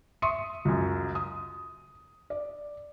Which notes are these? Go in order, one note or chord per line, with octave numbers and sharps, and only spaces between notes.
E5 C6 C#6 D#6 C#7 D#7
C#2 F#2
D#6
D5